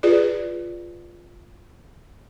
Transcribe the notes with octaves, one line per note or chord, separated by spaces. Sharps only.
F4 G#4 B4 D5